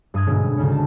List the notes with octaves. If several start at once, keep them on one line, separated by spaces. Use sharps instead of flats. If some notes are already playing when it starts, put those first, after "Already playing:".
G2 D#6 G#6
G#2 B2 D3 C#4
G3
D2 G#2 C#3 C#4
A5